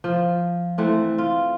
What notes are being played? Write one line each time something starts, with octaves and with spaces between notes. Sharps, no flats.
F3
E3 A3 C4
F4